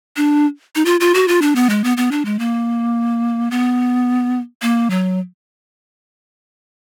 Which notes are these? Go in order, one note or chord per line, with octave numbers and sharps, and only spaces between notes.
D4
D#4
F4
F4
F#4
F4
D4
B3
G#3
B3
B3
D4
G#3
A#3
B3
A#3
F#3